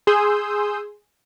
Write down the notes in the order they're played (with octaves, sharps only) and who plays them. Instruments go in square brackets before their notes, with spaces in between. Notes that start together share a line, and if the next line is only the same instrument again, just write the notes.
[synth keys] G#4 C6 D#6 E6 G6